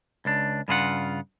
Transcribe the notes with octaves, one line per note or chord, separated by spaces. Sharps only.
C#2 D4
G2 C#3 F4 F#5